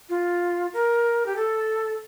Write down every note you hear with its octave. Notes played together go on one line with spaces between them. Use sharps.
F4
A#4
G4
A4